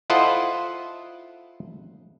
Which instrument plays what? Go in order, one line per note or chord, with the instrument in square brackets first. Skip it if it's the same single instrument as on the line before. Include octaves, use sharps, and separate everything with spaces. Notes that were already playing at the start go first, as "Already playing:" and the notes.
[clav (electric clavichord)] E4 F4 A4 C5 D#5 F#5